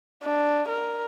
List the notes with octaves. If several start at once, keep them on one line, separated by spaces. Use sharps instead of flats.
D4
A#4